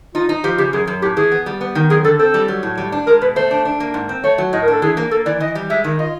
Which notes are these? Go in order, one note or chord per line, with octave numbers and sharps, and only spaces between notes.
D#4 F4
D#4
F3 G4
C#3 G4
F#2 G#4
F#2
A2 G4
E3 G#4
B3
G3
B3
D#3
F#2 G#4
D3 A4
C4 A4
G3
F#3
A2
G3
D4
G#3 A#4
B2 B4
A3 C5
D4
D4
A#3
G#2
C4
A3 C#5
F#3
A2 D#5
A#4
D4 A4
E3 G#4
A#3
A#3 A4
E3 D5
E3 D#5
G3
G#3 E5
D#3
F4 D#5